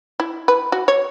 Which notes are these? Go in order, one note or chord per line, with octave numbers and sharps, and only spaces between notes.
E4
B4
F#4
C#5